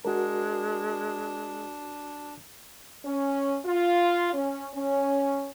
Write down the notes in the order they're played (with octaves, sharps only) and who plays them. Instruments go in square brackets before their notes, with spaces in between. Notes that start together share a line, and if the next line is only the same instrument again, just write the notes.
[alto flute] G#3 [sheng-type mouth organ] D4 [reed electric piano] F#4 A#4
[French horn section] C#4
F4
C#4
C#4